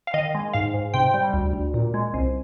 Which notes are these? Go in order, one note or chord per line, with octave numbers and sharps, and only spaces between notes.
F5
D#3 D#5
G#3
G#2 F5
G#2
C3 G5
G3
D2
D2
A#2
G#3
C2